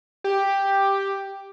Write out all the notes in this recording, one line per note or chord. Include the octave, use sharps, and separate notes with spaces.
G4